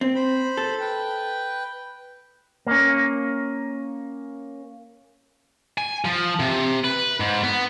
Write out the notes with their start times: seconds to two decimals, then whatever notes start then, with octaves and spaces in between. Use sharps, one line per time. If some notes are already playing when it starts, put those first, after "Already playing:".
0.01 C4
0.15 C5 B5
0.57 A4
0.80 B4 G5
2.67 A#3 C#4
5.78 G#5
6.05 F3
6.40 C3
6.84 B4
7.20 G#2
7.43 B3